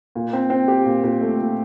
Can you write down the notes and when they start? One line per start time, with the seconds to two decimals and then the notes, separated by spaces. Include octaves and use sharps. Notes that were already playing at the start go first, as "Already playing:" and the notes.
0.15 A#2
0.33 C4
0.50 C4
0.68 G4
0.86 A#2
1.04 A#2
1.21 A3
1.38 A#2